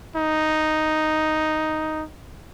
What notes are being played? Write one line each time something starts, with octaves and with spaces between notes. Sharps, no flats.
D#4